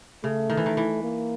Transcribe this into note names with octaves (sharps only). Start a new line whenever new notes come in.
C#3 A3
D#3
E3
D#3
E3
A#3